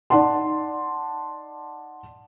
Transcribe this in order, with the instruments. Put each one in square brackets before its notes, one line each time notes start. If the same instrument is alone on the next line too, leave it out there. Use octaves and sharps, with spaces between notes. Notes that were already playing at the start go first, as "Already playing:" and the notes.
[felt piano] D#4 D5 F#5 A5 C6